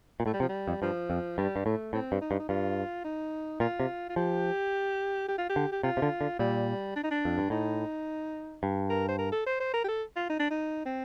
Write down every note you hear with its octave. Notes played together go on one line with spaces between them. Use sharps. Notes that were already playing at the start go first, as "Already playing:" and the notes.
A#2
A2 A3
G3
C3 F3
G3
F2
G2 F3
F2
G2 G3
G2
A2 A3
A2 C4
G2
D#4
G2
D#4
G2 F4
D#4
A#2 F4
C3
F4
F3 G4
G4
F4
G4
D3
G4
C3 F4
C3
D3
D3
A#2 G3
D4
D#4
D4
F2
G2
A2 D#4
G2
A#4
C5
A#4
A4
C5
C5
A#4
G4
A4
F4
D#4
D4
D#4
C4